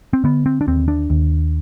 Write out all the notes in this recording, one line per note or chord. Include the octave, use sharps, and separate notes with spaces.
C4
D3 B3
C4
D4
D#2 C4
D4
D#2